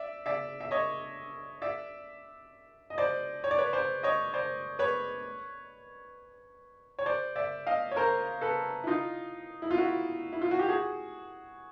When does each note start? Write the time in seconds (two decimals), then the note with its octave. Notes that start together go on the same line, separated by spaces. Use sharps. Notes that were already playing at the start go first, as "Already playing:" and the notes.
Already playing: D5 E5
0.26 D5 E5
0.60 E5
0.71 C#5 D#5
1.62 D5 E5
2.90 D#5
2.98 C5 D5
3.44 C#5
3.51 D5
3.58 B4 C#5
3.73 C5 D5
4.03 C#5 D#5
4.34 C5 D5
4.79 B4 C#5
6.99 C#5
7.06 C5 D5
7.36 D5 E5
7.67 D#5 F5
7.91 C#5
7.96 A#4 C5
8.41 A4 B4
8.84 E4
8.87 D#4 F4
9.62 E4
9.71 F4
9.78 E4 F#4
10.32 E4
10.42 F4
10.51 F#4
10.59 G4
10.69 F#4 G#4